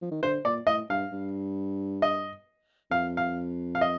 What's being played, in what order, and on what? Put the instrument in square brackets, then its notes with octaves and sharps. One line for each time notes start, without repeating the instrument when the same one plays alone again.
[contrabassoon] F3
D#3
[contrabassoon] D3 [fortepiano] C5
[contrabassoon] A#2 [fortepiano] D5
[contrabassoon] A2 [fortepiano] D#5
[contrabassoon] G2 [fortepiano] F5
[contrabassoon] G2
[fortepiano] D#5
[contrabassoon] F2 [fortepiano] F5
[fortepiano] F5
F5
D#5